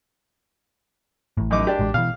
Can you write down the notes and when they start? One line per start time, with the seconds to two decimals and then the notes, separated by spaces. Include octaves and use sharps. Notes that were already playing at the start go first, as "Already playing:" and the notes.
1.37 A1 A2
1.51 F#2 D#4 D6
1.67 D4 G4
1.79 A1 G#3
1.94 B2 E3 F5